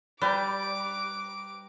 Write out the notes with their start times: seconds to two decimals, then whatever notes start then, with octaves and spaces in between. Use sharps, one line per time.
0.21 G3 B4 G5 A#5 D6